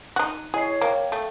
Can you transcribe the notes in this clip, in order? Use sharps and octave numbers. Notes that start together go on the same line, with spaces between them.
D#4 F#4 F#6
E4 G#4 C#5 D#5 C7
A#3 C5 F5 G5
A3